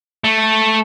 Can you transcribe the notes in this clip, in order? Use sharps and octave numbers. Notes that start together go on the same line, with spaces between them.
A3